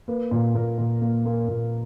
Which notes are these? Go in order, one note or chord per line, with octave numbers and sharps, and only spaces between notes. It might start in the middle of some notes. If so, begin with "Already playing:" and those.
A#3 B4
A#2
A#2 A#4
A#2
A#3
A#3
A#2